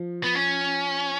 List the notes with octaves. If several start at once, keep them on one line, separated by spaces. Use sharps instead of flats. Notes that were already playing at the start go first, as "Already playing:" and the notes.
Already playing: F3
B3
C#4